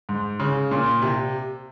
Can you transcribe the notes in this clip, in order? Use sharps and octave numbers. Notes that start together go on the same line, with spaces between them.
G#2
C#3
A#2
C3